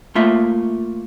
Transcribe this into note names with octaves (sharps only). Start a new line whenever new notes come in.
A3 A#3 F4 E5